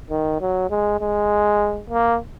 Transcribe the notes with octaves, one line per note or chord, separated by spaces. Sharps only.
D#3
F#3
G#3
G#3
A#3